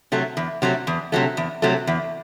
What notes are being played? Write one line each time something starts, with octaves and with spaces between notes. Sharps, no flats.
C3 F#3 A3
E2
C3 F#3 A3
E2
C3 F#3 A3
E2
C3 F#3 A3
E2